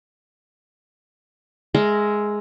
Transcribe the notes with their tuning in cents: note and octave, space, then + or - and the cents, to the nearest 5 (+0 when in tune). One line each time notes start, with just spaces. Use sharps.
G#3 +5 A#4 +0 E5 -10